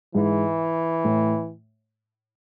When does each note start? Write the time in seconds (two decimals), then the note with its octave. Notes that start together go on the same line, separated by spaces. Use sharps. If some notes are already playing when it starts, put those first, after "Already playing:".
0.15 G#2 E3
1.05 A2